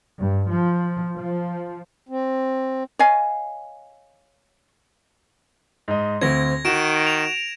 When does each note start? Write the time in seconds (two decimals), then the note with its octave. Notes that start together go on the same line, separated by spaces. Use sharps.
0.18 G2
0.52 F3
1.17 F3
2.09 C4
2.99 C#5 D#5 F5 G#5
5.88 G#2 D#5
6.21 D2 C4 G#6 A#6
6.65 D#3 F#4 D7 E7
7.07 F7